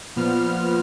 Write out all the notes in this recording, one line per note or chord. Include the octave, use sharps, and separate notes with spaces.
A#2 F3 B3 F6